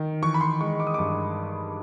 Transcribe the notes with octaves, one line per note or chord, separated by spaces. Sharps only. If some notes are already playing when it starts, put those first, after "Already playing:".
Already playing: D#3
E3 C#6
B5
C6
G#3 C#6
D6
D#6
G2 D6